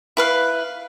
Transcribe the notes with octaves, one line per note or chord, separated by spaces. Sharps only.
E4 B4 F5